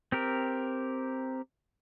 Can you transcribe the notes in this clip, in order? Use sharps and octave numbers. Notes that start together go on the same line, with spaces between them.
C4 G4 A#4